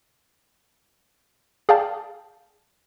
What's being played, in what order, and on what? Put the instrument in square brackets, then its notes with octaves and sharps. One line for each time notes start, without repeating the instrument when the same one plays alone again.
[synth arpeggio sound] G#4 D5 F5 G5 A5